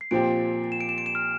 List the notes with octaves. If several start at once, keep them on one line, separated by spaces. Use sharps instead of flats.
C7
A#2 F3 C4 G4 D7
E7
D7
E7
D7
E7
F6